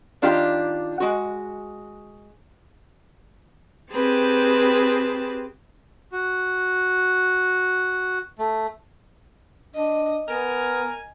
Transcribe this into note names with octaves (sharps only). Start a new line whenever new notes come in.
D#3 D4 F4 G4 F5 A#5
G#3 F#4
C4 G4 G#4 B4 A5
F#4
A3
D4 D#5
B3 A#4 G#5